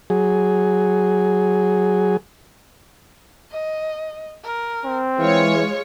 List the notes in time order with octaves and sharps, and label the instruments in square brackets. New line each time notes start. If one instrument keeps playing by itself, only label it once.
[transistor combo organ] F#3 G#4
[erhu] D#5
A#4
[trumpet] C4
[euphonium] E3 [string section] G#3 C#5 [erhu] F4